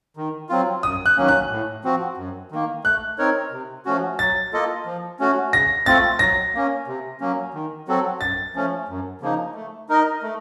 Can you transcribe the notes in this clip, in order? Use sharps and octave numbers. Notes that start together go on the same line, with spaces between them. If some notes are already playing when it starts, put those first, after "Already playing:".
D#3
F#3 C4 F4
F#2 D#6
F#6
D#3 F#3 A#3 C#4
F#6
A2
F3 C4 F#4
F#2
D#3 A#3
A3 F#6
C4 D#4 A#4 C#5
C3
F3 A3 C#4 F#4
F#3 A6
A#3 F4 A4 D#5
F3
A3 C#4 F#4
C#3 A#6
A3 C4 F4 A4 A6
F#3 A#6
A#3 C#4
C3
F#3 A#3 C#4
D#3
F#3 C4 F#4 A4
F#2 A6
F3 A3 C#4
F#2
C#3 F3 A#3 D#4
A3
D#4 A#4 D#5
A3